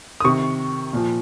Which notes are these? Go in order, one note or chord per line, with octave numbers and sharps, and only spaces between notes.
D#6
C3 D#3 C#6
A#2 F3